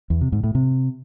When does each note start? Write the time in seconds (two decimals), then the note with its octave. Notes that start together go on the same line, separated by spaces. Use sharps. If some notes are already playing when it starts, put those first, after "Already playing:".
0.10 E2
0.21 C3
0.32 G#2
0.44 A2
0.55 C3